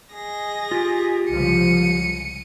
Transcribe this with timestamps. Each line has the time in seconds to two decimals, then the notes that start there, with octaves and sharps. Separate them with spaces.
0.14 G#4 D#5 A#6
0.71 F4 G4
1.30 C2 C#3 F3 G#3 C#7 D#7